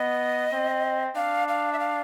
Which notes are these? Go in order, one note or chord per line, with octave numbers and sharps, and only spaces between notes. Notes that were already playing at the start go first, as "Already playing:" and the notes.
Already playing: B3 D#5
C4
D4 F5
F5
E5
F5